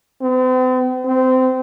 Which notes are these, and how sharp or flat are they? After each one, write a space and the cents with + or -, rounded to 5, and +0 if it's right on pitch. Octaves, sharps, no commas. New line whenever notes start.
C4 -45
C4 -20